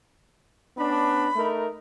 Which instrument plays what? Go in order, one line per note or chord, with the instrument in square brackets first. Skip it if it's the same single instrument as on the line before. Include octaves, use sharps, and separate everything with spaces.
[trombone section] B3 C#4 D4 [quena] B5
[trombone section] A3 D#4 A#4